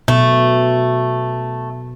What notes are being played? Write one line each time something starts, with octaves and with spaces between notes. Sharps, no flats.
B2 A3